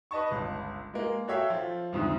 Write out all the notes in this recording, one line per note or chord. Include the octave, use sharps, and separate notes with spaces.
B4 D#5 A5 C#6
G1 C#2 A5
G#3 A#3
F#4 A4 C#5 E5 F5 G5
F3 F4
C2 F2 G#2 D3